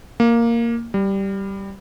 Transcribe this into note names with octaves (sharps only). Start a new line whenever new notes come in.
A#3
G3